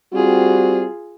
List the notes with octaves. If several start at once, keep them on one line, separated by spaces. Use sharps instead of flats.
G3 C4 F4 F#4 G#4